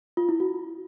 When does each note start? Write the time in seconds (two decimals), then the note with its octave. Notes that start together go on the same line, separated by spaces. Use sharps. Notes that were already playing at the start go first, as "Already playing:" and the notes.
0.17 F4
0.29 E4
0.40 F#4